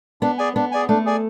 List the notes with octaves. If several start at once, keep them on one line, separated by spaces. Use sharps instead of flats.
B3 D4
G#4 D5 G#5
B3 D4
G#4 D5 G#5
A3 D4
G#4 D5 G#5